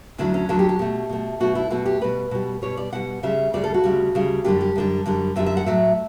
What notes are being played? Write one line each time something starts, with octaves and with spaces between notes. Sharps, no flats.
D2 D3 F#3 E4
C#4
D2 D3 F#3 A4
G4
G4
B2 A3
B2 A3
B2 A3 F#4
E4
B2 A3 F#4
G4
B2 G3 B4
B2 G3
B2 G3 C#5
D5
B2 G3 F#5
D2 C#3 G3 E5
D2 C#3 G3 D5
A4
F#4
D2 C#3 G3
D2 C#3 G3
F#2 D3 G3 G4
G4
F#2 D3 G3
F#2 D3 G3
F#2 D3 G3 E5
E5
F#5
A2 F#3 A3 E5